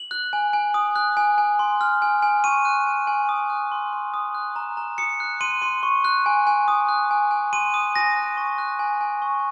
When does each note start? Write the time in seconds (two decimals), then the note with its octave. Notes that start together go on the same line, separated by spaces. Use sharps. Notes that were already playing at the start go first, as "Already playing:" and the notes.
Already playing: F#7
0.11 F#6
0.33 G#5
0.53 G#5
0.74 D#6
0.96 F#6
1.17 G#5
1.38 G#5
1.59 C6
1.81 F6
2.02 G#5
2.22 G#5
2.44 C#6 D#7
2.65 F#6
2.87 G#5
3.07 G#5
3.29 D#6
3.50 F#6
3.72 C6
3.93 C6
4.14 D#6
4.35 F#6
4.56 A#5
4.77 A#5
4.98 D#6 C#7
5.20 F#6
5.41 C6 D#7
5.62 C6
5.83 C#6
6.05 F#6
6.26 G#5
6.47 G#5
6.68 D#6
6.89 F#6
7.11 G#5
7.31 G#5
7.53 C6 D#7
7.74 D#6
7.96 G#5 A#6
8.16 F#6
8.37 C#6
8.58 F#6
8.79 G#5
9.01 G#5
9.22 C#6